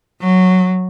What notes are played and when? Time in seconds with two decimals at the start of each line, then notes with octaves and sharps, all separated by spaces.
0.21 F#3